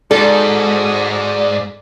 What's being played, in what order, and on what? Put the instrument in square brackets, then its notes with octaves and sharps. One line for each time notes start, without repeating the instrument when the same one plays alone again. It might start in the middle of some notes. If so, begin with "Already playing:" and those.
[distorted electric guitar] G#2 [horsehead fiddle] F#4 G#4 [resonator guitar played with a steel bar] A4 [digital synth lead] D5